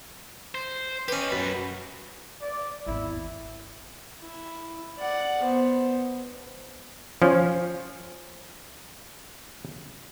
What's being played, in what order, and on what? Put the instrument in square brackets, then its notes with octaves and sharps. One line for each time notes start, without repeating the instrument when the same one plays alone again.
[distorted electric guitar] C5
[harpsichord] C#4 B4 [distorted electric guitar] G4 D#5
[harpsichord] F#2 [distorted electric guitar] F#3 B4
[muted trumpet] D5
[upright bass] G#1 E2 [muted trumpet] E4
[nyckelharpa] E4
D5 F#5
B3 C5
[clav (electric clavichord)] F3 C#4